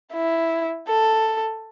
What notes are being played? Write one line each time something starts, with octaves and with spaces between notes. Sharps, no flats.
E4
A4